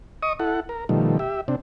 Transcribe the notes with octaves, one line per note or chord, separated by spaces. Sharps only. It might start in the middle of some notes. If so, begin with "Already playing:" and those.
D#5 C#6 D#6
E4 A4 F#5
A#4
B2 D#3 F3 G3 A3
G4 E5
C3 C4 D4